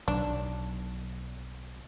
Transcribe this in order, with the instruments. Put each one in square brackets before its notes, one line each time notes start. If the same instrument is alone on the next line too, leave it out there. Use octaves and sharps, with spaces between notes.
[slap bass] B1 D#3 F#3 [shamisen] D4